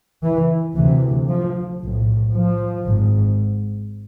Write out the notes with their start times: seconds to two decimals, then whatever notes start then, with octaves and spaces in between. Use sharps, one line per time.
0.23 E3
0.76 D2 C3 E3
1.29 F3
1.81 B1 A2
2.33 F3
2.86 G#1 G#2